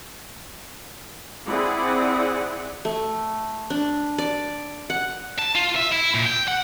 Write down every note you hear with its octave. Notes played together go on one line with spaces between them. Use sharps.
C4 E4 G#4 D5 F#5
A3
D4
D5
F#5
A5
F4
E5
E4
A#2
G5
F#5